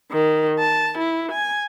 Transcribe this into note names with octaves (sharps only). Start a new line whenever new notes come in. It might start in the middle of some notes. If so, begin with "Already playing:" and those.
D#3
A5
E4
G#5